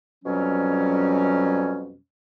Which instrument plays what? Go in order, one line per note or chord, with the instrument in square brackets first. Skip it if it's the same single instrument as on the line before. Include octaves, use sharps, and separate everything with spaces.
[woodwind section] F2 B2 F#3 G3 C#4